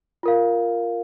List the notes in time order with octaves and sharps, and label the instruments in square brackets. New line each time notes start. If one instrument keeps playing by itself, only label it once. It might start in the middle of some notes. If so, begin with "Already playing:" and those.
[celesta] F4 A#4 F5